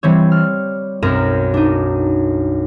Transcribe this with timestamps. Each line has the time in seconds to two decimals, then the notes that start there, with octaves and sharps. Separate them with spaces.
0.03 E3 G3 C4 C#5
0.32 F6
1.02 B1 F#2 C4 A#4 E7
1.54 D4 D#4